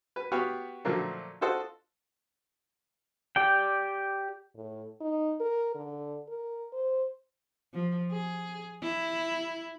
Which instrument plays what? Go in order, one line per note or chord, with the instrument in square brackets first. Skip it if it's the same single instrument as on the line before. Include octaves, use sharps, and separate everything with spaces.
[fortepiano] B4
B3 F#4 G4 C#5 F5 B5
A#2 D3 F3 F#3 A3 A#3
F4 F#4 A4 C5 D#5 F#5
[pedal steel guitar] G4 D5 G5
[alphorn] A2
D#4
A#4
D3
A#4
C5
[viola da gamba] F3
G#4
E4